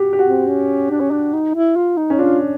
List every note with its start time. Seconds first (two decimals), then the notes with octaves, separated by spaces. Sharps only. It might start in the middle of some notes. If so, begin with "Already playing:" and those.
Already playing: F#4 G4
0.13 G4
0.19 F#4
0.25 C4
0.47 C#4
0.91 D4
1.01 C#4
1.11 D4
1.33 D#4
1.55 E4
1.76 F4
1.97 D#4
2.10 C#4
2.19 D4 F4